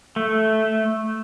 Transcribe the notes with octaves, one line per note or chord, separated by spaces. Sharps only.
A3